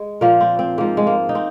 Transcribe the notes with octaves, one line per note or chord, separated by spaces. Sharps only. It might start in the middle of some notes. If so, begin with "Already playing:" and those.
Already playing: G#3
A#2 F3 A#3
C4
C4
G#2 F3 A#3
G#3
A#3
D#4
C4